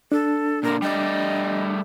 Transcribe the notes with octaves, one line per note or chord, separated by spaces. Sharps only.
D4 A4
A#2 D3 A#4
G3 A3 D5 D#5